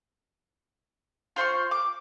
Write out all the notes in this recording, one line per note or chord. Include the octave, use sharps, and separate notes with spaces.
F4 C5 C6 C#6
D6